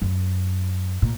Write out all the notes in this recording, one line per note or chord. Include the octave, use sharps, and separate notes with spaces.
F#2
A#2